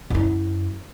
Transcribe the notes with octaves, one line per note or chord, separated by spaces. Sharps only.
F#2 E4